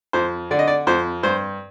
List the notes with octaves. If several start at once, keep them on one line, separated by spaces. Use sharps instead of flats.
F2 C5
D3 D5
D#5
D5
F2 C5
G2 C5